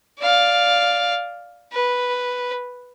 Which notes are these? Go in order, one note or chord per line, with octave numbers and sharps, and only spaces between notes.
D5 F5
B4